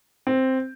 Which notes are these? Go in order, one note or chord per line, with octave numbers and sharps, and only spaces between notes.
C4